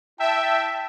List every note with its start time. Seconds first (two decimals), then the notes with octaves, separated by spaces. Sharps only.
0.20 E4 E5 G5 A5